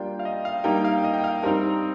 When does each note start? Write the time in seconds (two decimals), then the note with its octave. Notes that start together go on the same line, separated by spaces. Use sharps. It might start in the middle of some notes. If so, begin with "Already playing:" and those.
Already playing: G3 A#3 D4 F4 G5
0.19 F5
0.25 D#5
0.45 F5
0.64 G3 A#3 D#4 G5
0.84 F5
1.04 D#5
1.14 G5
1.24 F5
1.43 G3 C4 D#4 A#4